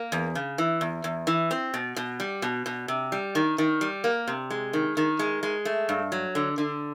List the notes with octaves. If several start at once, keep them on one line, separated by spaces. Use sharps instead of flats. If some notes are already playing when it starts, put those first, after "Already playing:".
Already playing: A#3
E2
C#3
E3
E2
E2
E3
C4
B2
B2
G3
B2
B2
C3
G3
D#3
D#3
G3
A#3
C3
G#3
D#3
D#3
G#3
G#3
A3
G2
F#3
D3
D3